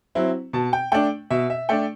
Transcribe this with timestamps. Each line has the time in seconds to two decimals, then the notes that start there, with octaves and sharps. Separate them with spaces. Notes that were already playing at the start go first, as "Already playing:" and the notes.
0.15 F#3 C4 E4
0.53 B2 A5
0.73 G5
0.92 A3 D4 G5
1.31 B2 E5
1.50 E5
1.69 A3 D4 G5